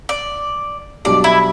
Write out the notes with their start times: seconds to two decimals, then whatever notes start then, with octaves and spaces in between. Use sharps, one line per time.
0.09 D5
1.05 B1 B2 G3 D4 G4 D5
1.24 E4